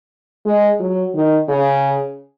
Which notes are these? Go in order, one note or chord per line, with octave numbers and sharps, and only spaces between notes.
G#3
F#3
D#3
C#3